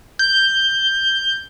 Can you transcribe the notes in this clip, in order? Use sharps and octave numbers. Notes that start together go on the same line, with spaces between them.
G6